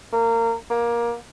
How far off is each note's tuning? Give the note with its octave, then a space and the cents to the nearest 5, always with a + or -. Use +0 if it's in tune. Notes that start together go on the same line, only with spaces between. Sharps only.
A#3 -25
A#3 +20